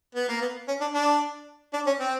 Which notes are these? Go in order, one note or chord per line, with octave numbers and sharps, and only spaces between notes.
B3
A#3
B3
C#4
D4
D4
D4
C#4
C4